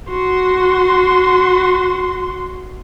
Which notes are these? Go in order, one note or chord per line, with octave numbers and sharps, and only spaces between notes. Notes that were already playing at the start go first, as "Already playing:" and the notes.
F#4 C6